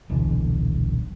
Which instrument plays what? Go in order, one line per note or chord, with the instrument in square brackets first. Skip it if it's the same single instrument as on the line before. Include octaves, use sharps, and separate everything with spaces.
[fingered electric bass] D#1 B1 D3 E3